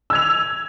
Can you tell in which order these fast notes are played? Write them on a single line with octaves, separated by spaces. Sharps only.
E6 G#6 F7